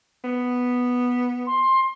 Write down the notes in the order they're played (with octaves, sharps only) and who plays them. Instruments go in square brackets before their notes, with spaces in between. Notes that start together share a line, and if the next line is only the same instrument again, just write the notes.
[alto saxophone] B3
[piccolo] C6